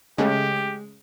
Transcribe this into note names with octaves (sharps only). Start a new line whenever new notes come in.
C#3 G#3 A3 G4